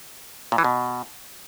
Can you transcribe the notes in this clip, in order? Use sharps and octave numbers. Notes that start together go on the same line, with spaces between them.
A#2
E3
B2